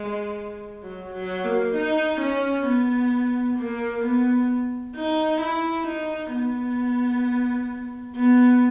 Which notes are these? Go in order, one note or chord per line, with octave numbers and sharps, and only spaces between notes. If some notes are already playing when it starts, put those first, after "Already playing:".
Already playing: G#3
F#3
F#3
A#3
D#4
C#4
B3
A#3
B3
D#4
E4
D#4
B3
B3